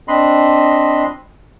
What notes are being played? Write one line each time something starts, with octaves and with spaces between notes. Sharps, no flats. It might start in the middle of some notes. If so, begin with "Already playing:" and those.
C4 D4 D#5 B5 C6